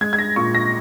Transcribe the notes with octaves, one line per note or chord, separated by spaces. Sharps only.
G#3 G#6
G#6
A#6
A#2 C#6
A#6